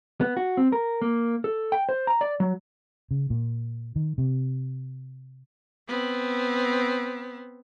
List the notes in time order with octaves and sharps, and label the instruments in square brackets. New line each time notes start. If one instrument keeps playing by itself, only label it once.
[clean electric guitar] B3
F#4
C4
A#4
A#3
A4
G5
C5
A#5
D5
F#3
[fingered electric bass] C#3
A#2
D#3
C3
[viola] B3 C4